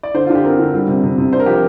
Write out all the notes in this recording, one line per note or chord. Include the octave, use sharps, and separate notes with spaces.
D5
D3 C5
D3 F4
G4
C4 A#4
D3
G3
C3
C3
C3
D4 C5
A#4
F3 G4
A#4